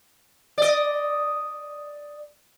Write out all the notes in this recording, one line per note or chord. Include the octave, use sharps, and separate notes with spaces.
D5 D#5